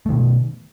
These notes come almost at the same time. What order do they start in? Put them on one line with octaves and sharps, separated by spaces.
A3 D#3 B2